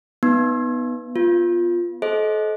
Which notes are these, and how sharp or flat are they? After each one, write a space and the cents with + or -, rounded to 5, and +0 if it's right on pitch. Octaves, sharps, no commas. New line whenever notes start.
B3 +0 D#4 +0
B3 +0 F4 +0
A4 -40 C5 +25 D#5 +15